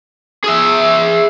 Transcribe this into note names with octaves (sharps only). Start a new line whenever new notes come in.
G#4 E5